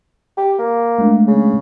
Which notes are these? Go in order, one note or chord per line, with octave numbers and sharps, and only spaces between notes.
G4
A#3
G#3 A3 D4
C#3